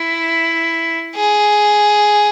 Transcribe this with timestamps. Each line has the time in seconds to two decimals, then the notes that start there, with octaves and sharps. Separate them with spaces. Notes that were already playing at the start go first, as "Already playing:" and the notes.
Already playing: E4
1.15 G#4